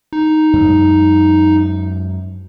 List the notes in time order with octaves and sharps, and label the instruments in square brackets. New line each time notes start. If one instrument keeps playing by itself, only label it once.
[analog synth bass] D#4
[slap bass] F#2 G#3